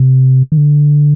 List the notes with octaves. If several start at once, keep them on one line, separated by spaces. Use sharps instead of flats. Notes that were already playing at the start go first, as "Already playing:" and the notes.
Already playing: C3
D#3
D3